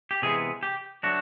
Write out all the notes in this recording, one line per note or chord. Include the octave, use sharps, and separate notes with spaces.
G4
C3 E3 G#3 B3 G#4
G4
F#3 A3 D4 F#4